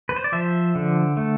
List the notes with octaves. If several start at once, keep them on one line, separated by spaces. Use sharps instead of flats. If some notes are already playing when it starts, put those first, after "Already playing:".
B4
C5
D5
F3 C5 E5
D3
A3